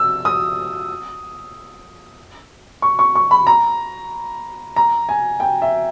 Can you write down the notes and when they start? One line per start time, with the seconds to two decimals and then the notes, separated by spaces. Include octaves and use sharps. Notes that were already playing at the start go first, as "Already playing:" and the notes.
Already playing: E6
0.25 D#6
2.82 C#6
2.99 C#6
3.15 C#6
3.31 B5
3.47 A#5
4.76 A#5
5.09 G#5
5.40 G5
5.62 E5